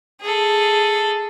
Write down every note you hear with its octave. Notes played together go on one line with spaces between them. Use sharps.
G#4 A4